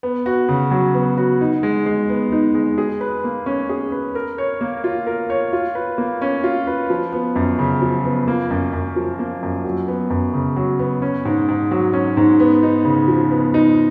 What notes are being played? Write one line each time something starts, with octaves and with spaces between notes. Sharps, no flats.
B3
F#4
C#3
F#3
B3
F#4
D#4
G#3
G#3
B3
D#4
G#3
G#4
B4
A#3
C#4
G#4
B4
A#4
C#5
A#3
F4
A#4
C#5
F4
B4
A#3
C#4
F4
B4
F3
B3
F#2
C#3
F3
B3
A#3
F#2
F#2
F3
A#3
F#2
F#3
B3
F#2
C#3
F#3
B3
C#4
G#2
G#2
F#3
C#4
G#2
B3
D#4
C#3
F3
B3
D#4